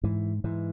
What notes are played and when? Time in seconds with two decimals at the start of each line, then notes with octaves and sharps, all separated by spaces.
0.03 G#2 E3
0.44 G#2 E3